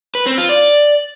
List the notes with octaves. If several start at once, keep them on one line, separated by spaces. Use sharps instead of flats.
B4
C4
F4
D5